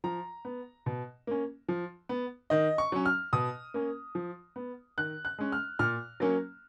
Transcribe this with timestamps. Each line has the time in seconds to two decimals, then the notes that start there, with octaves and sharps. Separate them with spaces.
0.04 F3 A#5
0.45 B3
0.86 B2
1.27 A#3 C#4
1.69 F3
2.09 B3
2.50 D#3 D#5
2.78 C#6
2.92 F#3 C#4
3.06 F6
3.33 B2 D#6
3.74 A#3 C#4
4.15 F3
4.56 B3
4.98 D#3 F#6
5.25 F#6
5.39 G#3 C#4
5.52 F6
5.79 A#2 F6
6.20 F#3 A#3 C#4